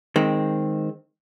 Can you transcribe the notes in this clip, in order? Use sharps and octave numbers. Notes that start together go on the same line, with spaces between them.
D#3 G#3 C4